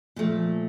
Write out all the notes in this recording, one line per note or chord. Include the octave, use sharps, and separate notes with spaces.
A#2 F3 A3